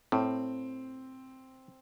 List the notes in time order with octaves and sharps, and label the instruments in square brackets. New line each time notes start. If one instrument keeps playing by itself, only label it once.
[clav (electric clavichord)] A2 [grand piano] C4